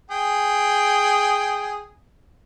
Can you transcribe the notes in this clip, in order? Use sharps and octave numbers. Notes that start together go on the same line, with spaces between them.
G#4 G5